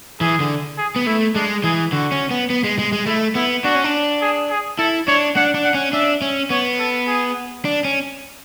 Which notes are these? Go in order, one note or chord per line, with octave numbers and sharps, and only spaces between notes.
E3 G#4
D3
G#4
B3
A3 E4
G#3 D4
E3 G#4
D3 F#4
C#4
B3
B3
G#3
G#3
G#3
A3 E4
B3 E4
D4 F#4
C#4
D4
G#4
G#4
E4 A4
D4 C#5
D4 F#5
D4
F#5
C#4
D4 E5
C#4
B3 C#5
A4
G#4
D4
C#4